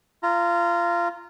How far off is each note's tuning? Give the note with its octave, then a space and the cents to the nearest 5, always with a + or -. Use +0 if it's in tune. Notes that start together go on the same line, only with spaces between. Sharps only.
F4 -20 A#5 -10